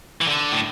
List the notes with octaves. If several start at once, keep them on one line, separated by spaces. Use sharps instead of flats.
E3
D3
A2